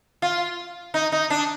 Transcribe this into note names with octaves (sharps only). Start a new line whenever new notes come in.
F4
D#4
D#4
D4